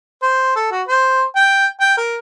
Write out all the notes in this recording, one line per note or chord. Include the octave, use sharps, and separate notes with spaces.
C5
A4
F#4
C5
G5
G5
A#4